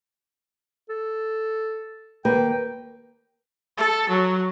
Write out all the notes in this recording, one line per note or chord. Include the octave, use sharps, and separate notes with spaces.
A4
D#2 A#3 B4 G5
A4
F#3